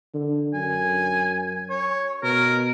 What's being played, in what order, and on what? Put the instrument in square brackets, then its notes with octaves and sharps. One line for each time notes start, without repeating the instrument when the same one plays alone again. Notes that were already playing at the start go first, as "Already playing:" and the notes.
[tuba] D3
[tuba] F#2 [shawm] G#5
[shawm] C#5
[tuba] B2 [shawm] A#4